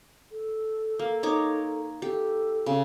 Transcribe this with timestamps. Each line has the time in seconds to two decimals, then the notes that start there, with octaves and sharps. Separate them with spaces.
0.32 A4
0.99 A#3
1.23 D#4 C#5 D6
2.02 G4 A4
2.66 C#3